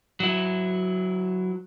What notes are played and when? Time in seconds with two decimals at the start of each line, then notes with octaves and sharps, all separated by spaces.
0.20 F#3 E4